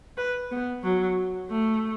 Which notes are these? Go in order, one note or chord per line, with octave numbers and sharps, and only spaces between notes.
B4
B3
F#3
A3